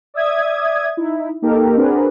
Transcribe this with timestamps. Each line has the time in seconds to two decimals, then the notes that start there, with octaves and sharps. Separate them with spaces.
0.14 D5 E5 D#6 G#6
0.97 D#4 E4
1.42 A#3 D#4 G4 A4 A#4
1.77 C4 D4 F#4 G#4 A#4 B4